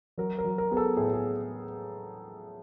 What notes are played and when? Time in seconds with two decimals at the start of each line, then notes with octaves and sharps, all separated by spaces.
0.18 F#3 A#4
0.39 A#4
0.44 F#3
0.58 A#4
0.71 B3 G#4
0.77 A4
0.97 A2 G#4
1.13 G#4